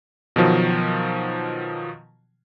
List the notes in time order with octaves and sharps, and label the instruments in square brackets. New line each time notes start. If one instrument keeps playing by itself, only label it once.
[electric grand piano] B2 D#3 F3 F#3